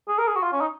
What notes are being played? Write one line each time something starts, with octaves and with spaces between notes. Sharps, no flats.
G#4
A#4
G#4
F#4
F4
C#4
D#4